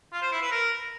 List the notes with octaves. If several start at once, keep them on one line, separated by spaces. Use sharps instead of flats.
F4
C5
E4
B4
A#4